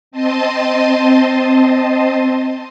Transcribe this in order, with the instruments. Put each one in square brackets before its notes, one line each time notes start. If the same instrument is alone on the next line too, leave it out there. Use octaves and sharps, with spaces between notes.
[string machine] C4 D#5 A5 C6 D#6